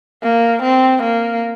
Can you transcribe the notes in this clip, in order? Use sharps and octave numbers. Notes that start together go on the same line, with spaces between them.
A#3
C4
A#3